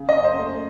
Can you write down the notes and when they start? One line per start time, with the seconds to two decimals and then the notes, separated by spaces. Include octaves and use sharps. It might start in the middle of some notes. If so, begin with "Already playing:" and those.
Already playing: C#3
0.09 D#5
0.16 F#2
0.24 C5
0.39 A3